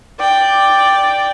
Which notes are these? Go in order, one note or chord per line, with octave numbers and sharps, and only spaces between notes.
D5 G5